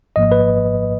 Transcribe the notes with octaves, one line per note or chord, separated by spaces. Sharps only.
G#1 G#2 F3 A#3 D#5
B4